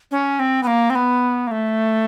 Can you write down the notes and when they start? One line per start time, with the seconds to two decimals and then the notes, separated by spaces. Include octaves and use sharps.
0.11 C#4
0.39 C4
0.63 B3
0.67 A#3
0.90 C4
0.95 B3
1.47 A#3
1.51 A3